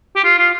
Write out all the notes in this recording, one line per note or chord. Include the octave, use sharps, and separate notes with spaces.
G4
F4
F4